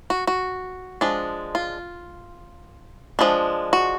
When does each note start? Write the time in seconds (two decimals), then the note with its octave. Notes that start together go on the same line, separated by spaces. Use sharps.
0.10 F#4
0.27 F#4
1.01 F3 G#3 D4
1.55 F4
3.19 F3 G#3 D4
3.73 F#4